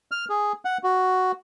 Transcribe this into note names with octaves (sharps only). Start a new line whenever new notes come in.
F6
G#4
F#5
F#4